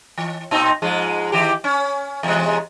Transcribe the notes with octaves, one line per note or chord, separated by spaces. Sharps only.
E3
A#2 C4 D#4
G#2 F3 G#3
D#3 E3 G4
C#4
E2 C3 G#3